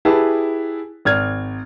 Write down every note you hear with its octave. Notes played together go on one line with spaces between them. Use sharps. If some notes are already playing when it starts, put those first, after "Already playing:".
E4 G4 G#4 B4 A5
G#1 F6 G#6